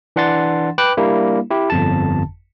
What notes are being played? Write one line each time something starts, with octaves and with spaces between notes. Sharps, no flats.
E3 D4 F#5 C6 A6
B4 G5 D6 F#6
G3 A#3 D4 E4
E4 G4
G1 F2 A5